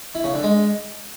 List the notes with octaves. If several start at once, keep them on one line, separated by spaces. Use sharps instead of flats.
E4
C#3
D3
G#3